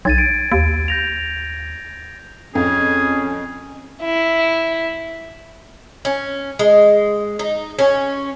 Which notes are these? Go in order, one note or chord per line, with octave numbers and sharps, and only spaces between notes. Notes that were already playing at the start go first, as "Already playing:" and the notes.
B1 G#6 A6 D#7
D7
D#2 D7
G6 A#6 F7
F2 C#4 G#4
E4
C#4
G#3
D#4
C#4